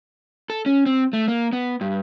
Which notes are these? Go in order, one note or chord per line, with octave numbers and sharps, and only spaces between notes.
A4
C#4
C4
A3
A#3
B3
G2